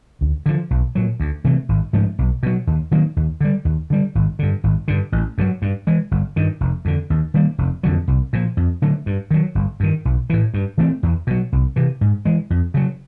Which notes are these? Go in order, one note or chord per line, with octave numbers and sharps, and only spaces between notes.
D2
D3 F3
B1
A#2 F#3
D2
C3 E3 A3
G#1
G#2 F3 A3
B1
B2 F#3
D#2
D#3 F#3 A#3
D#2
D3 G3
D#2
D3 G3
G#1
G2 D3
G#1
G2 D3
A1
G2 D3 F#3
G2
E3 G#3
G1
G2 D#3
F1
F2 D3
D#2
D#3 G3 A#3
F1
F2 D3 F#3
C2
A#2 F3
F2
D3 F#3 A3
G2
D#3 F#3
G1
G2 D#3
B1
A2 E3
G2
E3 A3 C4
E2
B2 F#3
C2
C3 E3
G#2
E3 G#3
F2
C#3 F#3